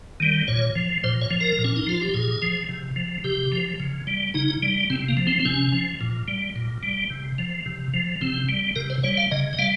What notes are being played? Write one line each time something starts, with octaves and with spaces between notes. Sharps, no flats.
D#3 G3
A#2 C#5
F3
A#2 C5
C#5
F3
A#4
A#2
C#4
D#4
F3 F4
G4
A#2 G#4
F3
C3
F3
C3 G4
F3
C#3
G3
C#3 D#4
G3
C3 C4
A#3
F3
C4
C4
C3 C#4
F3
A#2
G3
A#2
G3
C3
F3
C3
F3
C3 C4
G3
C3 A#4
C5
G3 C#5
F5
C#3 D#5
D#5
G3 F5